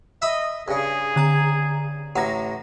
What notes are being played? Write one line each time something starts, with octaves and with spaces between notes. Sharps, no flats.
D#5 E5 B5 D#6
G2 C#3 G#4
D3 A#5 G#6
A1 A2 F#5 A#5 A#6